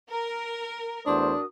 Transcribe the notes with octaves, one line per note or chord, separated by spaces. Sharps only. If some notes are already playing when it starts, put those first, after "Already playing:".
A#4
E2 A3 D4 F#4 A#4 C5 D#6